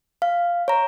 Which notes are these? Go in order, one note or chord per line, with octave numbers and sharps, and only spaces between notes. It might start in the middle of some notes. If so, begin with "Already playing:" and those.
F5
C#5 A#5